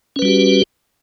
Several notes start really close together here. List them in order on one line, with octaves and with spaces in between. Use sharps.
C#4 B4 G3 F#4 G4